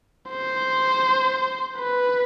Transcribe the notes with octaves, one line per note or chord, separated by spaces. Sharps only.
C5
B4